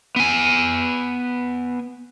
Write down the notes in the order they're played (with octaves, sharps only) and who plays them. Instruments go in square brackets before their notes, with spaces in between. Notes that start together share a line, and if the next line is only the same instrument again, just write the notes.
[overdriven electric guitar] B3 G#5